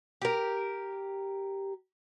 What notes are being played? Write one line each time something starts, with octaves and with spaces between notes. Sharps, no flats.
G4 A#4